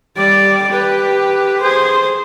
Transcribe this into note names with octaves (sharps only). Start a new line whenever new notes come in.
G3 D5
G4 B4
G#4 C5